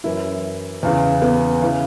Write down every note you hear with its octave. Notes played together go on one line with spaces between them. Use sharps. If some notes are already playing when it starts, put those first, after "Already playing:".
F#2 E3 E4
E2 C#3 E3
B3
C#3 E3